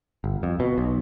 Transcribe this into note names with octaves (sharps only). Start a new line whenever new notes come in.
G1
F2
B2
B1